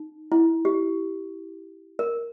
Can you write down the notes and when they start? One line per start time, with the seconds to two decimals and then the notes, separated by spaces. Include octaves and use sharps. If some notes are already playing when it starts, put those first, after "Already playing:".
Already playing: D#4
0.32 E4
0.65 G4
1.99 A#4